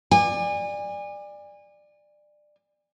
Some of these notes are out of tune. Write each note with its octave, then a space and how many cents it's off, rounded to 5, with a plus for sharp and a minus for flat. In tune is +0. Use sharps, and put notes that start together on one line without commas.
D5 +20 G#5 -30